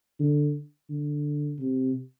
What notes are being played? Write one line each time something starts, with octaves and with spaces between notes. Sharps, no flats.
D3
D3
C3